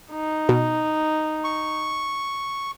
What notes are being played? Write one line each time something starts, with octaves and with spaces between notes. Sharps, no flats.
D#4
B2
C#6